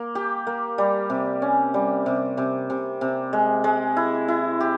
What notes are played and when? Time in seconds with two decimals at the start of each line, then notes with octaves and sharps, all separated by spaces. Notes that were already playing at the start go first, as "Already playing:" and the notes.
Already playing: A#3
0.15 G4
0.47 A#3
0.78 G3
1.10 C3
1.42 C#4
1.74 G3
2.06 C3
2.37 C3
2.70 C3
3.01 C3
3.33 G#3
3.64 G#3
3.97 E4
4.28 E4
4.60 G4